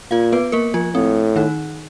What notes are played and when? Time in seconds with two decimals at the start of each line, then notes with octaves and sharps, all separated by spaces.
0.11 A#2 F4 F5
0.32 B3 B4
0.52 A#3 A#4
0.74 F3 F4
0.94 A2 C4
1.36 D#3 D#4